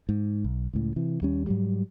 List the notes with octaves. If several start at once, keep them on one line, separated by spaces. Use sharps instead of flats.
G#2
B1
C#2 A2
C3 E3
D#2 G3 C#4
G#2 F#3 G3